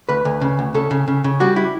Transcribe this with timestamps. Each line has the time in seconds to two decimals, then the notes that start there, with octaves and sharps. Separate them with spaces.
0.09 D2 B4
0.25 D2
0.41 C#3
0.59 D2
0.74 C#3 A4
0.91 C#3
1.08 C#3
1.24 C#3
1.40 G3 F#4
1.56 E4